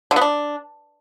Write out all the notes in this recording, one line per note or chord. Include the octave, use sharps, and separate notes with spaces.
D3
B3
D4